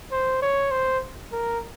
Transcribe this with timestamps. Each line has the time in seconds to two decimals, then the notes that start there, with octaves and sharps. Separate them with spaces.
0.11 C5
0.42 C#5
0.71 C5
1.32 A#4